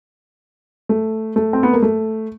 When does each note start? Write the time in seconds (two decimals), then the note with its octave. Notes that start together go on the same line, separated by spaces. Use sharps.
0.89 A3
1.36 A3
1.53 C4
1.63 B3
1.73 A#3
1.82 A3